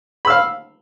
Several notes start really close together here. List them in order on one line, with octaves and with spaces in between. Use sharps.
B5 E6 F5